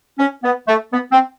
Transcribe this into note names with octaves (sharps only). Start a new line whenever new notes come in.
C#4
B3
A3
B3
C4